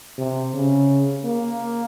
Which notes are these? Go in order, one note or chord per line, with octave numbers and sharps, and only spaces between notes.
C3
C#3
A#3